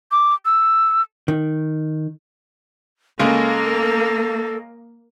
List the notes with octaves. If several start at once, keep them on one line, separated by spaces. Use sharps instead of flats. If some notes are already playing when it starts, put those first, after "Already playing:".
D6
E6
D#3
C#3 G#3 A#3 A4